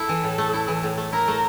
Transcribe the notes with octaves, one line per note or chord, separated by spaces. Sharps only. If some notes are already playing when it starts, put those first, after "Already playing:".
Already playing: E4 A4
E3
A2
A3
E4
E3
A2
A3
E4 A#4
A3